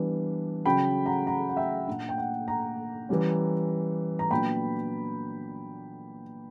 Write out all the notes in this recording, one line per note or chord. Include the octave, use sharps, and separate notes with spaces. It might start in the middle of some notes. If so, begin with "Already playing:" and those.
Already playing: E3 G3 B3 D4
C#3 F#3 C#4 G5 B5
F#5 A#5
F#5 A#5
F#5
E5 G5
A#2 A#3 D4 F#5
G5
F#5
F#5 A#5
E3 G3 C#4
A#5
A#2 F#3 B3 D4 G5 B5